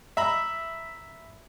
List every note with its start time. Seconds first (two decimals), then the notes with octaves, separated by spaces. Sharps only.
0.17 E5 A#5 B5